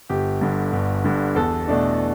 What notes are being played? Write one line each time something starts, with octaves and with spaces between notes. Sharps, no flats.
G1 G4
G2 D3
G1
G2 D3
E2 A4
B2 A3 D4